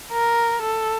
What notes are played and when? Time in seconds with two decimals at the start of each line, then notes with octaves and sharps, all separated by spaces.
0.12 A#4
0.62 A4